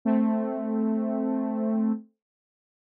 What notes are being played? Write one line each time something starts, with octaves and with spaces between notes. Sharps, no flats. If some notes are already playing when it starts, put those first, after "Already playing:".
A3 C4